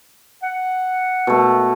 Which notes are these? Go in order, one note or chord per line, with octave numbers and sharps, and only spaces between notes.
F#5
B2 A3